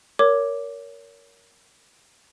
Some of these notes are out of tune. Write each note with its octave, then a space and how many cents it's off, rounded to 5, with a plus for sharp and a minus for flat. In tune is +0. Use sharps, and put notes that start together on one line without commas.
A#4 +0 C#5 +25 D6 +0